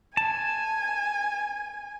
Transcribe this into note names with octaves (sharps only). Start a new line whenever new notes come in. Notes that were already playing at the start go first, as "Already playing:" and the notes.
G#5 A5